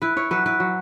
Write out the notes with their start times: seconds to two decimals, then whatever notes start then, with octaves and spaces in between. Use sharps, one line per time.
0.02 E4 B4
0.17 E4 C#5
0.31 F#3 B4
0.46 E4 B4
0.60 F#3